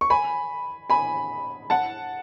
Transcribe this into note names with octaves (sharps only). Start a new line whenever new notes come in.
C#6
G#5 B5
G#5 B5
F#5 A5